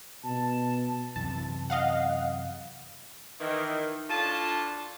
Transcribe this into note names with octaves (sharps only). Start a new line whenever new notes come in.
B2 A5
F#2 C3 E3 A5
D#5 F5 F#5
D#3 E3
A2 D4 F4 A5